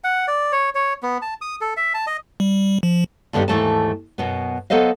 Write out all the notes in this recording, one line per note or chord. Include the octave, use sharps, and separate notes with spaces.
F#5
D5
C#5
C#5
B3
A5
D#6
A4
E5
A5
D#5
G3
F3
G2 D3 D#3 B3 D4 G4
D#2 G#2 E3 A3 A4 A5
F#2 B2 B3
F#3 B3 A4 C5 D#5 F5